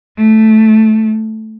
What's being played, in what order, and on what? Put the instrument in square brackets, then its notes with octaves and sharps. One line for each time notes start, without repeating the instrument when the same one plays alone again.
[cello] A3